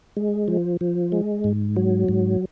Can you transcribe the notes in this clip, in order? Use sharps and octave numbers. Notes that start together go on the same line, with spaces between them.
G#3
F3
F3
G#3
G#2
F#3
G#2